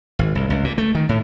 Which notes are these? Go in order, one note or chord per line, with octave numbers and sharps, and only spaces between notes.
G#1
C2
C#2
A#2
A3
D#3
A2